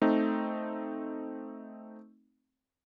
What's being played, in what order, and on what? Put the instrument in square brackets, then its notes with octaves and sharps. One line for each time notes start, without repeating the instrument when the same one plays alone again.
[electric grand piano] A3 C4 D#4